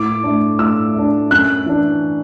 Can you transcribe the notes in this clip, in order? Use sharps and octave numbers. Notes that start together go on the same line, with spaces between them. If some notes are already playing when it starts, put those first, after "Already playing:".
Already playing: A2 D6
A3 D4
A2 E6
A3 D4
F#2 F#6
E3 D4